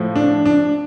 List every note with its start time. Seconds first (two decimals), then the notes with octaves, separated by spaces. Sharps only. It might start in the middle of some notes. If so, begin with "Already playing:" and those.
Already playing: A2 F3
0.16 D4
0.46 D4